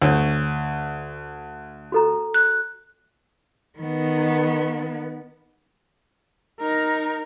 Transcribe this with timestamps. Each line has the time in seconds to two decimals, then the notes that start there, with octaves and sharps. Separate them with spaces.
0.02 D2 D4 C#5 D5
1.92 F#4 A4 A#5
2.34 F#6
3.79 D#3 B3
6.60 D#4 A#4